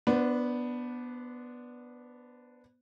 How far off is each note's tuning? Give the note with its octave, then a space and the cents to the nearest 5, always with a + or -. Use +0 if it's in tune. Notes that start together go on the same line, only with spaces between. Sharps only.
B3 -5 D4 +0 C5 -35